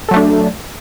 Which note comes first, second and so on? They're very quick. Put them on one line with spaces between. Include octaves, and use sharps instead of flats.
A4 F#3 A3 D4